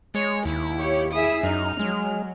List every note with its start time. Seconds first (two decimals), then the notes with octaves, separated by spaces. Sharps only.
0.15 G#3 C#5
0.45 D#2 E4
0.77 G4 C#5
1.12 E4 G#4 E5 D#6
1.43 F#2 D#4 F6
1.79 F#3 G#3